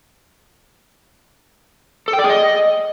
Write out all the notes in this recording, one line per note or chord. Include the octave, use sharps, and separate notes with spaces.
A4
G5
D5
G#4
D#5